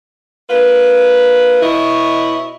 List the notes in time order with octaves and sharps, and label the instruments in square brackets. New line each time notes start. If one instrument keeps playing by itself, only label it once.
[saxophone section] A#3 F4 B4
[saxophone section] B2 C#5 D#5 [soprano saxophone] E4